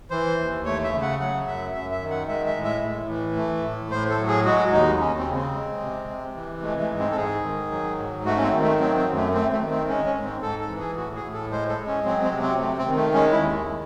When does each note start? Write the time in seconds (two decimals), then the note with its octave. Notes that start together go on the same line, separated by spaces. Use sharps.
0.11 E3 C5
0.38 D#2
0.65 A3 C#5
0.84 E5
0.93 C#3
1.02 F#5
1.20 F#3 F#5
1.47 F#2 E5
1.73 F#2 E5
1.91 E5
2.01 D#3
2.10 F#5
2.28 G#3 E5
2.46 E5
2.56 A2
2.64 E5
2.82 A2
3.09 E3
3.36 A3
3.64 A2
3.91 A2 C5
4.09 A4
4.18 F#3
4.28 G#4
4.45 G#3 F#4
4.72 D#2 D#4
4.99 D#2 C#4
5.18 C4
5.27 C#3
5.35 C4
5.54 G#3
5.81 C3
6.08 C3
6.35 E3
6.62 G#3 A3
6.81 A3
6.90 G#2
6.99 C4
7.11 A4
7.16 G#2 G#4
7.43 D#3
7.71 F#3
7.99 G#2
8.26 A3 F#4
8.37 C#4
8.43 C4
8.52 D#3
8.61 A3
8.79 F#3 C4
8.98 C4
9.07 F#2
9.16 A3
9.34 A3 C4
9.52 A3
9.60 D#3
9.71 C4
9.88 G#3 C#4
10.06 C#4
10.15 G#2
10.24 C4
10.42 G#2 A4
10.61 A4
10.70 E3
10.79 G#4
10.96 A2 F#4
11.15 G#4
11.24 A2
11.33 A4
11.50 G#3 C5
11.69 A4
11.78 G#3
11.87 C#4
12.05 F#3 C4
12.24 C4
12.32 C3
12.42 C4
12.59 A3
12.78 C4
12.87 D#3
12.96 A3
13.13 G#3 C#4
13.32 E4
13.40 D#2